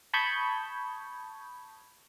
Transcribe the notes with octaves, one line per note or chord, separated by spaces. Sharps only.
A5 B5 C#6 D#6 G6 G#6